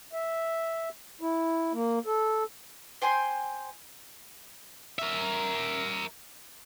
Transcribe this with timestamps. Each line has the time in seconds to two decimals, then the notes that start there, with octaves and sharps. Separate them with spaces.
0.13 E5
1.21 E4
1.73 A#3
2.06 A4
3.02 C5 G5 G#5 C6
4.99 A#4 E5